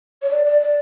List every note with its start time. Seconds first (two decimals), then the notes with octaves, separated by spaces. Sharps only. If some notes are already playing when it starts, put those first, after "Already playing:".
0.22 C#5
0.30 D5
0.44 D5
0.60 D5